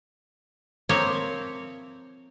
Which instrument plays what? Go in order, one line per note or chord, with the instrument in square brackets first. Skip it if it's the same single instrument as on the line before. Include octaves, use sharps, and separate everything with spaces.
[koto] F3 A#3 C4 C#5 E5 F5